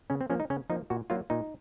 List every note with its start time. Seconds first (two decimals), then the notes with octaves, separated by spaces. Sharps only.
0.10 C#3 C#4
0.21 C4
0.30 F3 A#3 C#4
0.40 D#4
0.50 C#3 C#4
0.70 F3 A#3 D#4
0.90 A#2 F#4
1.10 F#3 A#3 F4
1.30 A#2 D#4